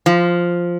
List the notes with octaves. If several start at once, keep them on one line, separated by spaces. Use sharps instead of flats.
F3